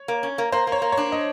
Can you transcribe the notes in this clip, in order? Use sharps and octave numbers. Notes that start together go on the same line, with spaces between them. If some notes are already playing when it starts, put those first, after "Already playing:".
Already playing: C#5
A#3
C#4
A#3
A#3 C5
A#3
C#5
A#3
C#5
D4
D#5